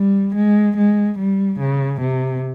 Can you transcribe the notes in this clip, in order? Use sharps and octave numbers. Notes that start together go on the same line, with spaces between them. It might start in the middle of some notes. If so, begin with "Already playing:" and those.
Already playing: G3
G#3
G#3
G3
C#3
C3